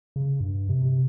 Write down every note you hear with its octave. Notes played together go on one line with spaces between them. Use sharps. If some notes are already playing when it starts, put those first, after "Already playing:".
C#3
G2
C3
C3